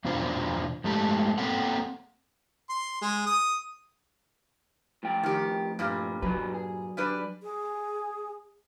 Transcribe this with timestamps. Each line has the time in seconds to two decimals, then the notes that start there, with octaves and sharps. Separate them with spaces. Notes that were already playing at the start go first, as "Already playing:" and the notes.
0.05 E2 B2 D4 F4 C5
0.84 A2 G#3 A3 G4 A5
1.38 A#3 C4 A4 F#5 G5
2.70 C6
3.01 G#3
3.26 D#6
5.03 A2 F3 G5
5.23 D#3 G4
5.79 G2 A#2 G3
6.22 F#3 F#4 G#4 B4
6.54 G#4
6.97 G3 D4 B4
7.43 G#4